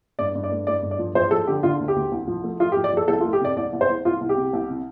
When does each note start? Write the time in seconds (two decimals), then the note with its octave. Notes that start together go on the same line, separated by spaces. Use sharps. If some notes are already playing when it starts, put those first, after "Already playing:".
0.19 G2 D5
0.35 G2
0.44 D5
0.52 A3
0.67 A3 D5
0.83 G2
0.91 D5
0.99 F3
1.15 F3 C5
1.31 F3 A4
1.47 D3 G4
1.63 D3 F4
1.80 D2
1.88 G4
1.96 D2
2.12 C2
2.27 F3
2.44 A3
2.60 F3 F4
2.72 G4
2.76 F3
2.84 D5
2.93 F3 A4
3.08 C2 A4
3.21 F4
3.25 A3
3.33 G4
3.41 C3 D5
3.57 C2 D5
3.73 C2
3.81 C5
3.90 C2
4.05 C2 F4
4.21 C2
4.29 G4
4.37 C3
4.53 C2
4.70 C3